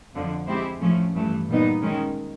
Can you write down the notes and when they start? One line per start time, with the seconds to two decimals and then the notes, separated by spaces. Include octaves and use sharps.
0.14 F2 D3 F3
0.47 G#3 C4 E4 G4 C5
0.81 A2 F3 A3 C#4
1.14 G2 E3 A3
1.48 A#2 G3 B3 D#4
1.82 D#3 G#3 C#4